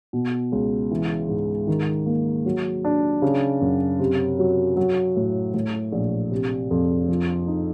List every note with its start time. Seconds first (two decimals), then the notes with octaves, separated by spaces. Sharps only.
0.13 B2
0.52 C#2
0.91 E3
1.29 G#2
1.67 D#3
2.06 A#3
2.46 F#3
2.85 D4
3.22 C#3
3.61 F#2
3.99 C3
4.39 F#3
4.76 F#3
5.16 A2
5.54 A2
5.92 A#1
6.31 C3
6.71 F2
7.08 F3
7.47 D#4